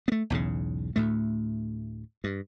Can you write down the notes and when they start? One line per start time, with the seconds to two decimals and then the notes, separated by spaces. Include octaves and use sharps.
0.08 A3 B3
0.30 B1 E2 G#2 C#3
0.96 D2 A2 A3
2.24 G2